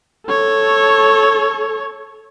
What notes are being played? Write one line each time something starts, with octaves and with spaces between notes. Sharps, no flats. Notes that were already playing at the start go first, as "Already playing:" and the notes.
A4 C#5